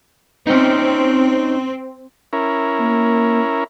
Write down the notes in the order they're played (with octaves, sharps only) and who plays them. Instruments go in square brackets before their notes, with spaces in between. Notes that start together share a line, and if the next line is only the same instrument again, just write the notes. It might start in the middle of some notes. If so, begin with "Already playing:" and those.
[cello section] C4 [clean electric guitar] C#4 D#4
[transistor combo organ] C#4 E4 A#4
[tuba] A#3